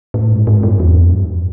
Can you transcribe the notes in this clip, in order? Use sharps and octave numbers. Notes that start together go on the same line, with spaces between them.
A2
G#2
G#2
G2
E2
F2
G2